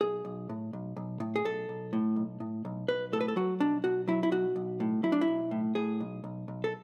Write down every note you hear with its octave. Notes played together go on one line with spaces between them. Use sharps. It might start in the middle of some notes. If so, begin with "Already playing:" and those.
B1 G#4
B1
A2
B1
B1
A2
G#4
B1 A4
B1
A2
B1
A2
B1
B1 B4
A2 A4
B4
A4
F#3 F#4
B1 D4
B1 F#4
F#3 E4
E4
B1 F#4
B1
A2
F#3 E4
D4
E4
B1
A2
A2 G#4
B1
B1
B1
A4